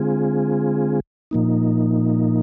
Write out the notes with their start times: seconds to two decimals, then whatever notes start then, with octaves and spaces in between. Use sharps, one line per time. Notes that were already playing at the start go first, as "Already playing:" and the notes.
Already playing: D3 G#3 C4 F4 G#4
1.31 A#2 F3 A#3 D#4